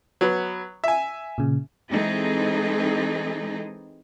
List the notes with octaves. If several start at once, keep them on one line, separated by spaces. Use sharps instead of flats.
F#3 B3
E5 G#5
A#2 C#3
E3 G#3 C4 D#4 G#4 A4